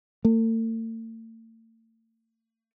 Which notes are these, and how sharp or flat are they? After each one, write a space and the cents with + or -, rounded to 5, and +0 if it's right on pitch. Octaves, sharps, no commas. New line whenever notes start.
A3 +45